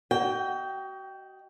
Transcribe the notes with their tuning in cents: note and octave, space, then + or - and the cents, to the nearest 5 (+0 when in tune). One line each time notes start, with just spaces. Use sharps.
F#4 +35 D#5 +10 G5 -5